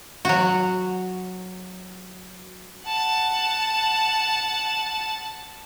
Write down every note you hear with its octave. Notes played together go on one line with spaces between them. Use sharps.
F#3 F#4
F#5 A5